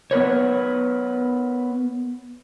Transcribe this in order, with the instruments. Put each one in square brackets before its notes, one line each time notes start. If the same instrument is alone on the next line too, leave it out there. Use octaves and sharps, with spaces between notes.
[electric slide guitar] B3 A#4 B4 C#5